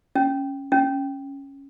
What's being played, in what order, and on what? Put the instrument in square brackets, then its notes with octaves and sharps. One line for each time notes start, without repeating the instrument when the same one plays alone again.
[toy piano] C#4
C#4